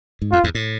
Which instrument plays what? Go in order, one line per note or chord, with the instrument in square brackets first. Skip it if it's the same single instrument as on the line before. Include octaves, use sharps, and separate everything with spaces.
[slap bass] G#2
[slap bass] F2 [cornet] F4
[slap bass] E2 G#2
A2